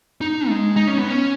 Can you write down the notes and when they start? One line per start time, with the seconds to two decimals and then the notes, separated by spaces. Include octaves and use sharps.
0.21 D#4
0.49 G#3
0.76 D#4
0.87 C#4
0.98 B3
1.08 C#4